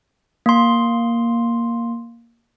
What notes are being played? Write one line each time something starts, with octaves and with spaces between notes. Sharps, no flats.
A#3 C6